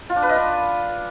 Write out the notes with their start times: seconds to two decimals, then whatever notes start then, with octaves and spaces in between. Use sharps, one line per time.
0.10 F4
0.16 D4
0.23 B4
0.29 D#5
0.36 D4